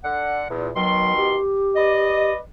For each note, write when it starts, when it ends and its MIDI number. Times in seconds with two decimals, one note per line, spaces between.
0.04 0.45 50
0.04 0.45 78
0.50 0.70 40
0.50 0.70 46
0.75 1.38 47
0.75 1.38 51
0.75 1.13 54
0.75 1.38 84
1.16 2.32 67
1.76 2.38 71
1.76 2.38 74
1.76 2.38 75